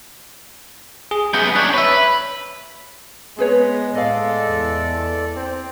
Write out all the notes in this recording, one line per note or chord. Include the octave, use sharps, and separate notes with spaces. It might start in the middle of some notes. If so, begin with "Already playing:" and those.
G#4
F#2 B3 G6
D4 C#5 F#6
B4 C#5 E5
G#3 B3 G#4 B4 C#5
A2 A4 D5 D#5 F5
E2
C4